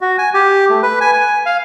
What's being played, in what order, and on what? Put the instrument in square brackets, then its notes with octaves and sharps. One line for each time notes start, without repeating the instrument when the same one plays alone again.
[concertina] F#4
G#5
G4
A3
B4
G#5
G#5
F5